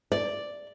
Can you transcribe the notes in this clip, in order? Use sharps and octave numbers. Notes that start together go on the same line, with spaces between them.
D5